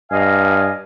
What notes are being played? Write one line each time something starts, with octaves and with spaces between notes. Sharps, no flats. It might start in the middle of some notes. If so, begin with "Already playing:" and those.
G2 D#5 F5 G#5